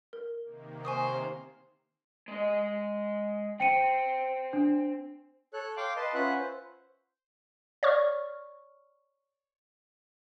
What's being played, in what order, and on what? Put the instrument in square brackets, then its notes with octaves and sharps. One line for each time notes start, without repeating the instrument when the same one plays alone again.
[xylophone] A#4
[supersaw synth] C3 D#3 A#3
[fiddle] C5 [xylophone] G#5 C#6 D#6
[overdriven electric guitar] G#3 D#5
[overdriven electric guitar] C4 [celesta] G5 C#7 D#7
[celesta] D4
[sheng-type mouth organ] A4 C#5 F#6
F5 G5 C6 D6
B4 D#5 A5 C6
C#4 F4 B4 E5 F#5 F#6
C5
[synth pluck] C#5 D5 C#6 F6